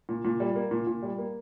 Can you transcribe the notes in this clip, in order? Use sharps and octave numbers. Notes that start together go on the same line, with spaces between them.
A#2
A#2
G3
A#3
A#2
A#2
G3
A#3